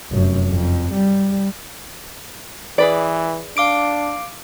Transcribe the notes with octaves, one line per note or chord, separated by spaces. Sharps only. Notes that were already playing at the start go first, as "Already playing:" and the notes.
F1 F#2
F2
G3
E3 G#4 B4 D5
D4 F5 D6 D7